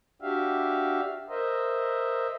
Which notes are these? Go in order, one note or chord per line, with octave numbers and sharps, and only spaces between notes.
D4 F#4 G4 E5 F5
A#4 C5 D#5 E5